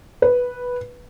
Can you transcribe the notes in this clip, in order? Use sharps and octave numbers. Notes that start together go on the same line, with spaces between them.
B4